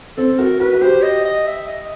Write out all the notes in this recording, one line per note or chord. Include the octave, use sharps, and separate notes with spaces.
C4 A4
F#4 A#4
F#4 B4
F#4
G4 C5
D#5
D#5
E5
D#5